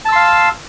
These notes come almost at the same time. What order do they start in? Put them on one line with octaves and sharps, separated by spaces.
A5 E6 C6 F5